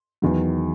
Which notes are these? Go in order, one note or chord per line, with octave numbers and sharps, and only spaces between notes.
E2 D#3 F#3